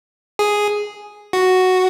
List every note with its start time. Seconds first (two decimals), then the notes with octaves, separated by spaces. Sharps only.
0.39 G#4
1.33 F#4